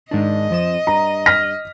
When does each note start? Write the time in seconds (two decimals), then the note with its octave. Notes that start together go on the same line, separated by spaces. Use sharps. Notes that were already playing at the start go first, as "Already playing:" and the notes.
0.11 G#2 D#3 D4 D#5
0.50 F2 F3 E7
0.87 G2 A#5
1.26 F6 A#6 B6